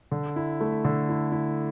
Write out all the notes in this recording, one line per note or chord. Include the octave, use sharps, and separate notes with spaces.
D3
E4
A3
D3
E4
E4